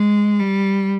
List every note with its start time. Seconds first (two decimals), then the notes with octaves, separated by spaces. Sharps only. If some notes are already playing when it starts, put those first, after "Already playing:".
Already playing: G#3
0.39 G3